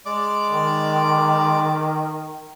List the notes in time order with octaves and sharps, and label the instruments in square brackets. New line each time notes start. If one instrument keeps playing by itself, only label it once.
[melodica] G#3 D5 D6
[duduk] D#3